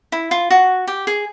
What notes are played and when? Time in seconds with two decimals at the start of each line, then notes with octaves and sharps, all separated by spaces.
0.12 E4
0.31 F4
0.50 F#4
0.87 G4
1.07 G#4